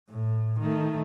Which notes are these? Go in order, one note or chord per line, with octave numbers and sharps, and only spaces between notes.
A2
D#3 A3